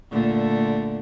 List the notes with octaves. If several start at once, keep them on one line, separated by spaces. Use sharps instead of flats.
A#2 D3 A3